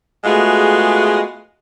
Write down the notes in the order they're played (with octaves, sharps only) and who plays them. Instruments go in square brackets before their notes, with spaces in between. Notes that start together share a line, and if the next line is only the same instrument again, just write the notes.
[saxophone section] G#3 A3 B3 F4 F#4 G#4